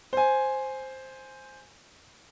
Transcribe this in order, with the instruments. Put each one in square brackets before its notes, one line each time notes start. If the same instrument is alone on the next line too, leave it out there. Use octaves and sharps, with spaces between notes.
[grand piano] C5 G#5